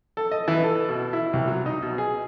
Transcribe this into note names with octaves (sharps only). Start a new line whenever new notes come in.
A4
D#5
E3
A4
B2
E4
C2
F#3
D#4
B2
G#4